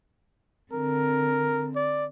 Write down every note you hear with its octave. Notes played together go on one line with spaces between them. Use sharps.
D3 C4 A#4
D5